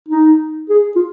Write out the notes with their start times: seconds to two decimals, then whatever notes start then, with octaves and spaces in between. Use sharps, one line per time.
0.08 D#4
0.70 G#4
0.96 F4